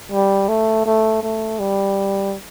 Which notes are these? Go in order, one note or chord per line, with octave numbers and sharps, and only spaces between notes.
G3
A3
A3
A3
G3